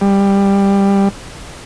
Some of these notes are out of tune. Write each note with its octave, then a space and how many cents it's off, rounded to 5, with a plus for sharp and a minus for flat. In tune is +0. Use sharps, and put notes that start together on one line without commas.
G3 +15